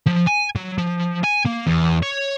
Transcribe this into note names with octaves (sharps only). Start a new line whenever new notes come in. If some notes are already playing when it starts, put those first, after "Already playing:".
F3
G#5
F#3
F3
G#5
A#3
E2
C#5